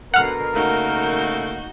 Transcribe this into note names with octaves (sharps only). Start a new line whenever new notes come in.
B2 D3 A#4 F#5 F6
C#3 A3 A#3 D#4 F#4 G6